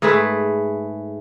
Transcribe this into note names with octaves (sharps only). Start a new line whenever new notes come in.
G#2 A3 G#4 B4